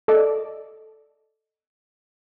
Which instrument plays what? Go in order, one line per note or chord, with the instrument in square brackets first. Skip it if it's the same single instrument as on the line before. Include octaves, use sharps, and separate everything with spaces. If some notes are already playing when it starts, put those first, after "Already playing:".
[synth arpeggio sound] A4 D5 D#5